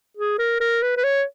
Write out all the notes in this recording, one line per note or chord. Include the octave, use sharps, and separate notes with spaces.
G#4
A#4
A#4
B4
B4
C#5